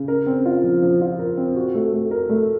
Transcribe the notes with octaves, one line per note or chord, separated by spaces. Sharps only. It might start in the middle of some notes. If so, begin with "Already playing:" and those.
Already playing: C#3
A#4
C4
F4
F3
F3
F4
A#4
C4
F#4
A3
A3
A#4
A3